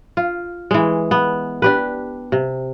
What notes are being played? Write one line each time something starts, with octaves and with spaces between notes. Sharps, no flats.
F4
E3 G#3
B3
D4 G4 B4
C3